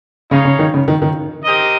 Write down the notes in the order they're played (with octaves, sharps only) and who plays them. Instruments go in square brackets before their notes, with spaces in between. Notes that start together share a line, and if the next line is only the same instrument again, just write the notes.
[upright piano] C#3 [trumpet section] D#4 G#4 C#5 F5
[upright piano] C#3
D#3
C#3
D#3
D#3
[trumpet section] C4 G4 A#4 D#5